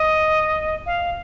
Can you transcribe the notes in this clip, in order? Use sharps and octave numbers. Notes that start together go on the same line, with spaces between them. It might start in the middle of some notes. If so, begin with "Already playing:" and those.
Already playing: D#5
F5